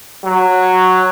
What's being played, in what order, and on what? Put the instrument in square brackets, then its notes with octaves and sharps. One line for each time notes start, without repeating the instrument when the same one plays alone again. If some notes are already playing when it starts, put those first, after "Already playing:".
[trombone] F#3